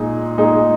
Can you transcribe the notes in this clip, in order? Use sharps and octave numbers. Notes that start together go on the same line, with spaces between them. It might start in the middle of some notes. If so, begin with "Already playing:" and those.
Already playing: A#2 G#3 D#4 G#4
A#2 G#3 D#4 G#4